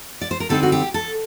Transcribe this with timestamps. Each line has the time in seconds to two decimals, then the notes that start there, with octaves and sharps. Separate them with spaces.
0.21 D5
0.31 C5
0.40 A#4
0.49 D3 G3 C4 D#4 A4
0.63 F#4
0.72 G4
0.94 A4